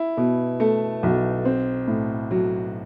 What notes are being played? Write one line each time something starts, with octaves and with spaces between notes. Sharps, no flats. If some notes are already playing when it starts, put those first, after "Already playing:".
Already playing: E4
B2
A3
B1
C4
A2
F#3